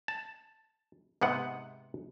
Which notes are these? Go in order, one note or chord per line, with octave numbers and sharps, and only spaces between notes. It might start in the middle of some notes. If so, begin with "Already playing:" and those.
A5
G#2 C3 B3 F#5